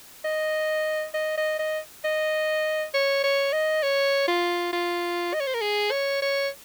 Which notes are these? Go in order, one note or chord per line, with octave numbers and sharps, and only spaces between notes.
D#5
D#5
D#5
D#5
D#5
C#5
C#5
D#5
C#5
F4
F4
D#5
C#5
C5
A#4
G#4
C#5
C#5